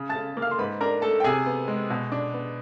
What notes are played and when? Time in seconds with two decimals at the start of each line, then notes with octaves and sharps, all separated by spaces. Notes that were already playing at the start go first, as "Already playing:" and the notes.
Already playing: C#3
0.09 A5 A6
0.15 C#3
0.37 A#3
0.42 F5 F6
0.51 C6
0.59 G#2 B4 B5
0.81 D4 A#4 A#5
1.02 A3 A4 A5
1.20 G5
1.24 C3 G#4 G#5
1.46 B3
1.68 G#3
1.90 B2
2.12 D4
2.34 B3